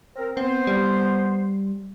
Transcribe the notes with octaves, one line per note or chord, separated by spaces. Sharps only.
C4 A#4
B3 C4 C5
G3